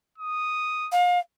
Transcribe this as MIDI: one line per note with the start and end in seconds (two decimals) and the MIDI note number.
0.18 0.89 87
0.92 1.19 77